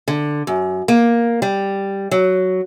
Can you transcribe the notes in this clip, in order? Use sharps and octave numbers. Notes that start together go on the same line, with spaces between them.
D3
F#2
A#3
G3
F#3